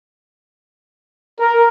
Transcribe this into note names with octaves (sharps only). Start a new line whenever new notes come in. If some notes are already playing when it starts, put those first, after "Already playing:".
A#4